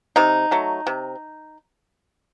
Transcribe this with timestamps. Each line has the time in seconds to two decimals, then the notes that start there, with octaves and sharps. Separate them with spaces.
0.16 C3 D#4
0.51 F#3 A3
0.87 C3